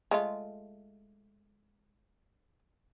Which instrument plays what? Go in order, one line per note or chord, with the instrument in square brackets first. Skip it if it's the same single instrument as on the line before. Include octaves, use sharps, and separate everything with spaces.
[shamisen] G#3 A3 F4